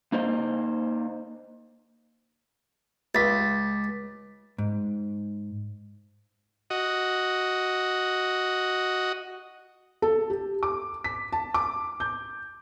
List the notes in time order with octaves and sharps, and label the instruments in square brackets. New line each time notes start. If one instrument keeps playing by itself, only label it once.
[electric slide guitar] A#3 D#4 C5 D#5
[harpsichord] C#2 [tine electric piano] A6 B6
[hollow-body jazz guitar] G#2
[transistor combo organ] F#4 D#5
[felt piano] A4
G4
D6
B6
A5
D6
G6